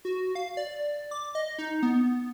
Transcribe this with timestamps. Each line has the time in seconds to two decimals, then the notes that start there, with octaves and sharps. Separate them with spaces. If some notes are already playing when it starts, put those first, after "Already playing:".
0.05 F#4
0.35 F5
0.57 D5
1.11 D6
1.35 D#5
1.58 D#4
1.83 B3